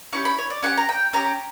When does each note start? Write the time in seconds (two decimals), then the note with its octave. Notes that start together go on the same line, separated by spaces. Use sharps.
0.13 C#4 E4 G4 C#6
0.25 B5
0.38 C#5
0.50 D5
0.63 C#4 E4 G4 F#5
0.77 A#5
0.89 G5
1.13 C#4 G4 A#5